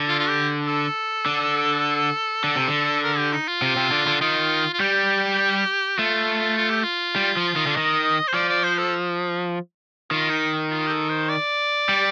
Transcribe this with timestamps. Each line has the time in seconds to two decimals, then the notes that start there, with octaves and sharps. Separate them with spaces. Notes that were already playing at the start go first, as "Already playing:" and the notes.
Already playing: D3
0.08 F4
0.19 F4
0.28 G4
0.67 A4
1.26 D3
2.44 D3
2.56 C3
2.68 D3
3.03 A#4
3.18 G4
3.33 D#4
3.48 F4
3.62 C3
3.77 C3
3.91 D3
4.07 D3
4.21 D#3 F4
4.73 F4
4.80 G3 G4
5.99 A3 F4
6.57 F4
6.70 G4
6.83 F4
7.16 G3
7.37 F3
7.56 D#3
7.67 D3
7.75 D#3 D#5
8.28 C5
8.34 F3 D5
8.49 D5
8.63 C5
8.79 A4
10.11 D#3 F4
10.30 D#4
10.71 F4
10.87 G4
10.90 A4
11.10 C5
11.29 D5
11.89 G3